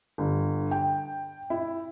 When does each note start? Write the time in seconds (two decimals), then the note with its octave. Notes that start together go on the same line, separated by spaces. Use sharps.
0.18 G1
0.71 G5
1.50 E4